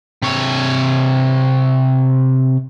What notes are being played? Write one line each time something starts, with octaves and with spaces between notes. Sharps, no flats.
C3 C#5